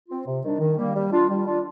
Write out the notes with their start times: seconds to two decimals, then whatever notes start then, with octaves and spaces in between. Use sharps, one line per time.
0.09 C4 F4
0.26 C3
0.43 D#3 G3 D4
0.60 D#3
0.77 G3 A#3
0.94 G3
1.11 D4 F4
1.29 G3
1.46 D4 F4